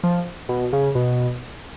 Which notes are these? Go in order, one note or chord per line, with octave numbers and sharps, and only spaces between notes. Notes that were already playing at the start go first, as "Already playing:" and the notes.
F3
B2
C#3
B2